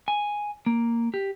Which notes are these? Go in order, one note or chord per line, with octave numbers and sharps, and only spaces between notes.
G#5
A#3
G4